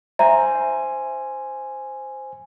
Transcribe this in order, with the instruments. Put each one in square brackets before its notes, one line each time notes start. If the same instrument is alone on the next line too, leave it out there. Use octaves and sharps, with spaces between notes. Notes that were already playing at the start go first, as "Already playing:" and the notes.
[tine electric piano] C5 G#5 [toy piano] E5 [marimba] A#5